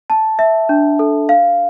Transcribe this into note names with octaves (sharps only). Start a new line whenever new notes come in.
A5
E5
D4
A4
F5